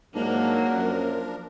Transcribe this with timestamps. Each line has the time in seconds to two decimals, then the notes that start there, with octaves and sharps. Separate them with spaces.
0.15 G#2 F3 F#3 A#3 D4 A#4
0.72 F#2